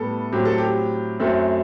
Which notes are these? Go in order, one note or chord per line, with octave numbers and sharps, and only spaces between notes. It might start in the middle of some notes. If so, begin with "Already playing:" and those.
Already playing: A2 G3 B3 A4
A2 F#3 C4 G4
A4
G4
F#2 F#3 A3 C4 A4